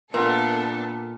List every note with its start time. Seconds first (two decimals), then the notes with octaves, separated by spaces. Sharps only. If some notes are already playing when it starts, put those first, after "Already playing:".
0.14 A#2 B3 D4 A4 A#4 E5 F#5